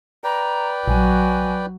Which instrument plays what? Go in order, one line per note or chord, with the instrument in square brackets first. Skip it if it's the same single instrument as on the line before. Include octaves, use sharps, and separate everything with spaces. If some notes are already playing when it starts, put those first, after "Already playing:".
[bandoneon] B4 D5 G5 [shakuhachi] A#5
[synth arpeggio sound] A#1 [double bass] F#3 [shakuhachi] G#5